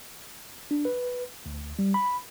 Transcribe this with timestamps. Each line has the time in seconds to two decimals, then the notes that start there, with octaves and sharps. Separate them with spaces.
0.71 D4
0.85 B4
1.46 D2
1.79 G3
1.94 B5